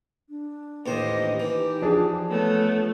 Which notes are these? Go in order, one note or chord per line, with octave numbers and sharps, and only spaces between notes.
D4
A1 D#2 G4 C5 D#5
E3 D#4 G4
F3 D4 G#4
A3 B3 C#5